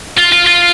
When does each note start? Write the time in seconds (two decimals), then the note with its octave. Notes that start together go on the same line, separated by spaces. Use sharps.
0.18 F4
0.32 F4
0.46 F4